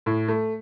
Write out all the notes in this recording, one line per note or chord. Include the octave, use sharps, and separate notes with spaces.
A2
A3